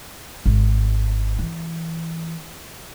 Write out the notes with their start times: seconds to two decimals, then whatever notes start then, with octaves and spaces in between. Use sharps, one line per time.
0.46 G#1
1.39 E3